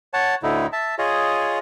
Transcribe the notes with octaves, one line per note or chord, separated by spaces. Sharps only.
C#5 F#5 A5
D2 A2 D3 D#4 E4
E5 A5
F4 G#4 C#5 D#5